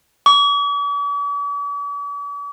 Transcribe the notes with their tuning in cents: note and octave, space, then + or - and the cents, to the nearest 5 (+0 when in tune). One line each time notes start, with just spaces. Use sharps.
D6 -45